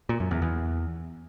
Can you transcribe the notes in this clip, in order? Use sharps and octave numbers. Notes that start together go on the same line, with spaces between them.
A#2
F#2
E2
E2